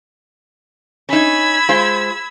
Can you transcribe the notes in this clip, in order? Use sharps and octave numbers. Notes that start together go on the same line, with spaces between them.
C#4 D#4 B5 E6 G#6
G#3 F4 C5